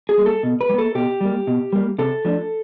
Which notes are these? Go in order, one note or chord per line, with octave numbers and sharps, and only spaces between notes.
G#4
G3 A#3
A4
B2
B4
G3
A#3 A4
B2 G4
G3 A#3
B2
G3 A#3
C3 A4
F3 A3 D4